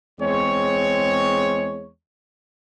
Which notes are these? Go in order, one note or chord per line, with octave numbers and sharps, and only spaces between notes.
E2 G#3 C4 C#5